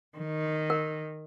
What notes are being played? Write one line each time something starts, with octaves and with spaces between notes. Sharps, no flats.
D#3
A#4